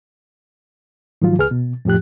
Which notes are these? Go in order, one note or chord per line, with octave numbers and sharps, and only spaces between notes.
G#2 D#3 F3 F#3 F4
C#2 G#4 B4 F6
B2
F2 A2 F3 G4 F#6